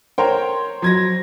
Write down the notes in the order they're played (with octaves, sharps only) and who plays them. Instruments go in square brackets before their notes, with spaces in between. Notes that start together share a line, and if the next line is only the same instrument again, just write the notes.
[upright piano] A#4 C#5 G5 [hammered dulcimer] C5
[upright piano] F#3 G#6 A#6